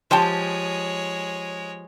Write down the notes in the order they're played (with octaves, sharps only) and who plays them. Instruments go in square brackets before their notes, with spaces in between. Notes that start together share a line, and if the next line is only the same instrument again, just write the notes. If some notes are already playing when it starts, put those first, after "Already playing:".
[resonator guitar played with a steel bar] F3 G4 [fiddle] G#3 C#5 [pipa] C5 G5 A5